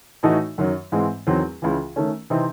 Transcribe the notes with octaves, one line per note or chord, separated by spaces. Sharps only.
A2 E3 A3 D#4 F#4
F#2 D#3 F#3
G#2 E3 G#3 C4
E2 D#3 F#3 C4
C#2 C#3 E3
D#3 A3 C#4
C3 E3 C4 D#4